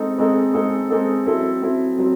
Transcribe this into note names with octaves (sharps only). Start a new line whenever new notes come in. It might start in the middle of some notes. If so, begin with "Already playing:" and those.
Already playing: G#3 C4 D#4 A4
G#3 C4 D#4 A4
G#3 C4 D#4 A4
G#3 C4 D#4 A4
F#3 C4 E4 A4
F#3 C4 E4 A4
F#3 C4